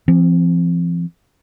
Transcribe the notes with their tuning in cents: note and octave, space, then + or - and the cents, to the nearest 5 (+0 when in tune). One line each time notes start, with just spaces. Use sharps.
F3 -40 C4 +0